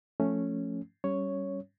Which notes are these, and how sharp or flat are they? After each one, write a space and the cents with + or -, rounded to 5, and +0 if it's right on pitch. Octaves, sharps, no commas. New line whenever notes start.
F3 +0 A3 +0 C#4 +0
G3 -15 C#4 +0 C#5 +0